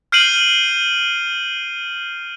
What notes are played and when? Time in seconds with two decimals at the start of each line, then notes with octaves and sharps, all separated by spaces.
0.12 F6 G6 C7 D7 D#7 F#7